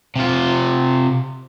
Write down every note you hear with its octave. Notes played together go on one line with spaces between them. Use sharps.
C3 F4